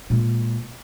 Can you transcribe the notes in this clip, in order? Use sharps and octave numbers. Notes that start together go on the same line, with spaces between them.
A#2 G#3